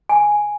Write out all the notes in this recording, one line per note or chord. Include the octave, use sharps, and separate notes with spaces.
G#5